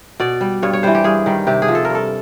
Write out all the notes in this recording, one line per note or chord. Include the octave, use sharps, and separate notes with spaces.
B2 D5
G3
G2 C#5
C#5
E3 G3 C5
G4
G2 G#4
D#3 G3
C3 G4
G#4
F3
A4
A#4
G2 A4